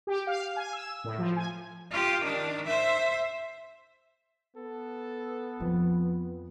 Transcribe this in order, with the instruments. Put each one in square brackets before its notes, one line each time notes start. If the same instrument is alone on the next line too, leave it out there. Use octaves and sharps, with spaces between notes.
[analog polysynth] G4
F5
G#5
E6
A2
F3
G#5
[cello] F4 G4
D#3 D4
C5 E5
[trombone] B3 [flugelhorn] A4
[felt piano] F2 [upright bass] F3